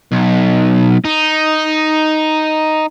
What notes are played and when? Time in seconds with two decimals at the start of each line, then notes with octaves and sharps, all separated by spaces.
0.12 B1
1.05 D#4